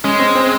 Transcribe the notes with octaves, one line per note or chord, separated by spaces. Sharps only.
G#3 C#4
C4
C4